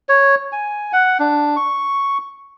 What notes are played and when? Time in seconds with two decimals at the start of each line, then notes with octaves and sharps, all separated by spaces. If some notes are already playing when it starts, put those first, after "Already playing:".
0.09 C#5
0.52 G#5
0.93 F#5
1.20 D4
1.56 C#6